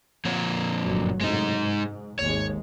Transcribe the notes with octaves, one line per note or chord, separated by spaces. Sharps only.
A#2 F3 C#5
G1 F#2 F#3
F#2 A2 C3 G#3 D#4
G#2
G#1 D#2 G#3 C#5